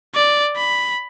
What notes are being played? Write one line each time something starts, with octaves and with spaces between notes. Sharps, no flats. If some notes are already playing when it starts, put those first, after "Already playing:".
D5
B5